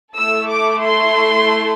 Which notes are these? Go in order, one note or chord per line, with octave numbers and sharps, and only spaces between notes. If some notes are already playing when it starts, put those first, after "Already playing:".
A3 E4 A4 E6
D6
C6